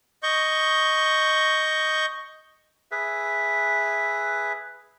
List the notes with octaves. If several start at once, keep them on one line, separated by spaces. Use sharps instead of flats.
D#5 C#6 G6
G#4 B4 E5